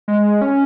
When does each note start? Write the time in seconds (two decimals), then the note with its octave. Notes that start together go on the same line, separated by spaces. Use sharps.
0.08 G#3
0.41 C#4